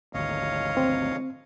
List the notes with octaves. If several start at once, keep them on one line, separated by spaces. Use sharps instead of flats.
G#1 D2 C#5 D#5 F5
C4